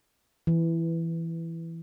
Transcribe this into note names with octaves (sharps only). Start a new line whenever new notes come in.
E3